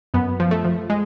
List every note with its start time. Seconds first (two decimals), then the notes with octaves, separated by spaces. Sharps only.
0.14 F#2 B3
0.40 F3
0.51 A3
0.65 F3
0.90 G#3